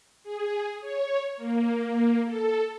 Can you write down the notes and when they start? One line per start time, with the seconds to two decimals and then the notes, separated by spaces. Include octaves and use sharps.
0.24 G#4
0.81 C#5
1.37 A#3
2.25 A4